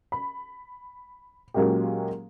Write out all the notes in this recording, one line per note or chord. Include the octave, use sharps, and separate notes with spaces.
B5
A#2 F#3 G#3 A#3 C#4 G4